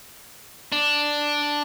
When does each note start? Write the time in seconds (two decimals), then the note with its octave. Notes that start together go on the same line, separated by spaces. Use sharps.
0.72 D4